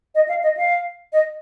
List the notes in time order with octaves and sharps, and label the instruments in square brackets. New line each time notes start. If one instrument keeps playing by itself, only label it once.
[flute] D#5
F5
D#5
F5
D#5